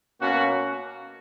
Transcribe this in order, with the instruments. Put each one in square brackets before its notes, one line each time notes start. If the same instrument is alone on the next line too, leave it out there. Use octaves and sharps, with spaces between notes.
[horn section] B2 A#3 C#4 F#4